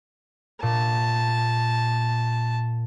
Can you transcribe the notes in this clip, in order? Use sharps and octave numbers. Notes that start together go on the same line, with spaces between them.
A#2 A5